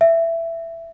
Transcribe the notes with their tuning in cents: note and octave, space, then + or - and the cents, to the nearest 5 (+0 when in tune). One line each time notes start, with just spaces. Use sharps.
E5 +15